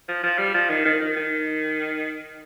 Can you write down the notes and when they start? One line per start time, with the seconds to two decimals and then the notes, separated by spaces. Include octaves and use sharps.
0.08 F3
0.23 F3
0.38 G3
0.54 F3
0.69 D#3
0.85 D#3
1.01 D#3
1.16 D#3